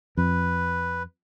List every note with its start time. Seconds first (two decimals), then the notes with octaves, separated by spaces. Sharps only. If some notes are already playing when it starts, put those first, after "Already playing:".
0.17 F2 B4